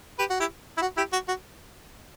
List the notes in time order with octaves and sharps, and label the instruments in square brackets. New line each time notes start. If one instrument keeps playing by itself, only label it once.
[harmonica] G4 B4
F#4
E4 G4
E4
F#4
E4 G4
F#4
F#4